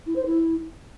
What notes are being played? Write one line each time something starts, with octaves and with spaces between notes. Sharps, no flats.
E4
C5
E4